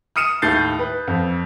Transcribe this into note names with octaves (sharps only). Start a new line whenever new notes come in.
D#6 F6 C#7 D#7 E7
D#2 A2 A3 G6 A6 C7
B4
F2